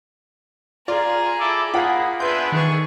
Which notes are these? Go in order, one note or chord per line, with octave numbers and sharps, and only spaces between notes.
F4 G#4 D5 A#5
E4 A4 D6
A#3 F4 G#4 F#5 B5
B3 D4 G#4 B4 E5 C6 G6
D#3 G#4 C#6